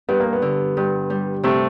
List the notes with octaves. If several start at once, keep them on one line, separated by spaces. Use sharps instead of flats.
G2 B3
A#3
B3
D3
G2
G3
C3 A3